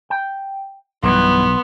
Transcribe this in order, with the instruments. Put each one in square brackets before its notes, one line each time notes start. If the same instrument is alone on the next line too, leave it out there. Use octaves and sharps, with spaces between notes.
[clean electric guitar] G5
[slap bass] B1 [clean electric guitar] G2 B2 E3 [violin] B3 [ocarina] C6